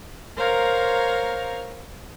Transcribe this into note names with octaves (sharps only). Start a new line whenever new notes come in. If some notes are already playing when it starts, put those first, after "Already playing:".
A#4 C5 C#5 F5 A#5